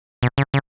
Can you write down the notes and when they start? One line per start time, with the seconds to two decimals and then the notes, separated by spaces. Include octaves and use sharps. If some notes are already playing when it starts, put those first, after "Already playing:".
0.23 B2
0.38 C#3
0.54 C#3